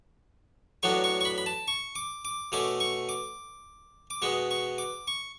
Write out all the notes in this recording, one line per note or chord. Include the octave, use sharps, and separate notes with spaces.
A2 F#3 B3 D4 C#6
C#6
C#6
B5
B5
A5
C#6
D6
D6
B2 A3 C#4 D6
C#6
D6
D6
B2 G#3 B3 C#6
C#6
D6
C#6